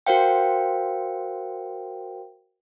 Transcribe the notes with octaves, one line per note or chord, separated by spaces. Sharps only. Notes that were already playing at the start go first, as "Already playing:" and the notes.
F#4 A#4 C5 F5 G5